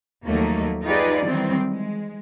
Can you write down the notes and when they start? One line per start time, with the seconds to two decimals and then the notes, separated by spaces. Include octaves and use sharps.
0.25 D#2 F3 F#3 A3 A#3 D#4
0.84 D#4 F4 G4 G#4 B4 D5
1.24 D#3 E3 F#3 G3 C4
1.70 G#3